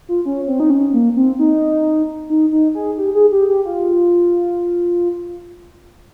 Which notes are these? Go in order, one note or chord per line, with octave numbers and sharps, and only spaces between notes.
F4
C#4
C4
D#4
C#4
A#3
C4
D#4
D#4
D#4
G#4
G4
G#4
G4
G4
F4